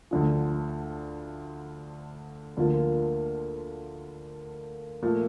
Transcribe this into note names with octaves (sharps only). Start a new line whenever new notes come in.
D2 D3 F3
D2 D3 F3 A#3 F4
A#2 F3 A3